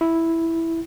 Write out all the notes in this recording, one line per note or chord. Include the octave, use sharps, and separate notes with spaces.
E4